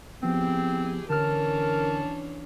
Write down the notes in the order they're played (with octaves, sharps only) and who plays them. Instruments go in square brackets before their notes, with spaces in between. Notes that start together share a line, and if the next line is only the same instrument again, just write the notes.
[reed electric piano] F3 B3 [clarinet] C4 [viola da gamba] E4 G4 G#4
[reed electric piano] D3 F6 [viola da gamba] E3 C#4 D4 [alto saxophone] A#4 [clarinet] A5